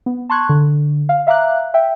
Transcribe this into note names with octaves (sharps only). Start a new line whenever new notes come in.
B3
A5 C6 C#6 F#6 G#6
D3
F5
E5 F5 A#5 D6 F#6
E5 G5